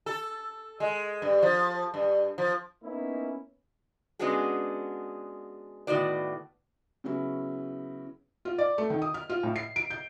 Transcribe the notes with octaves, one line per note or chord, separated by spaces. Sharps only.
A4
G#3
G2
F3
G2
F3
A#3 B3 C#4 D#4 E4
G#3 B3 C#4 D4 F#4 G#4
A2 D#3 B3 F#4 D5
C#3 F#3 B3 C#4 E4
F4
D5
A3
D#3
D#6
F6
F4
A2
C7
D7
G6